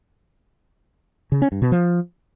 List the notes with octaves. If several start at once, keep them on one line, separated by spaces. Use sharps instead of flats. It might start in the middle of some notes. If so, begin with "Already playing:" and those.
C#3
C#4
G2
B2
F3